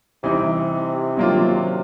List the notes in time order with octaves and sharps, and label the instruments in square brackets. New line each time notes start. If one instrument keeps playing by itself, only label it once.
[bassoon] C3 [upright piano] E3 G3 C4 D#4
[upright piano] D#3 F#3 A#3 D4 F4